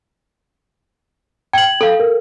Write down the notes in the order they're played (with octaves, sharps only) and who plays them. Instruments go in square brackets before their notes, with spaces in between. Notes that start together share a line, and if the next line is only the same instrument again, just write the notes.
[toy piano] G5 [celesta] G#6 F#7
[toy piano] A4 F5
[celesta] A#4